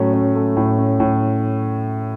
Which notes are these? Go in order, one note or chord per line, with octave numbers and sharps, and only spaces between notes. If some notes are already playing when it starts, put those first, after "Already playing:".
Already playing: A2 F#3 A3 C#4
C#4
A3
A2
C#4
A2